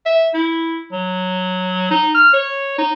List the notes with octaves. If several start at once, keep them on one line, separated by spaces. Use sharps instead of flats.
E5
E4
F#3
D#4
F6
C#5
D#4